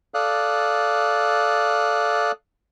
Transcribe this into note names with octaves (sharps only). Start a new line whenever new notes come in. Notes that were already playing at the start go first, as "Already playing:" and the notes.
A4 D5 F5 D#6 F#6